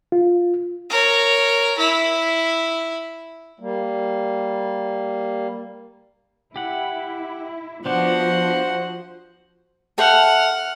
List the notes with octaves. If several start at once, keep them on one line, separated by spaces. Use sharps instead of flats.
F4
A#4 C#5
E4
G3 A#3
E4 G4 F#5
F3 B3 D4 F#4 C5 F#5
A4 E5 F#5 G5 F6